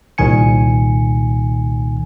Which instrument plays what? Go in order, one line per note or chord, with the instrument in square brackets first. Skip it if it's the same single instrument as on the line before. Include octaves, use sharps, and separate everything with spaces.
[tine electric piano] C2 A#2 D#3 G#5 C#7